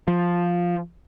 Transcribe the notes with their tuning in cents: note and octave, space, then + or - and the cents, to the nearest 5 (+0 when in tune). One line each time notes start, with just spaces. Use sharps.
F3 +5